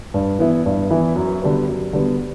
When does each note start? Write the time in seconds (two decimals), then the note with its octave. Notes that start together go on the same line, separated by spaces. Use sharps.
0.14 G2
0.39 E3 B3 E4
0.66 G2
0.90 E3 B3 E4
1.16 F#2
1.42 D3 G3 B3
1.67 F#2
1.93 D3 G3 B3